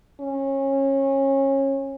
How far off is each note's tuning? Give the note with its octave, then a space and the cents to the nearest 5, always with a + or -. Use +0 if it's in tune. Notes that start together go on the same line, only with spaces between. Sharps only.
C#4 -25